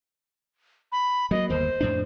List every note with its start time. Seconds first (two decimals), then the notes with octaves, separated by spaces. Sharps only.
0.92 B5
1.31 F#3 G#3 A#3 D#5
1.50 G1 D#2 A#3 C5
1.81 F2 A2 D4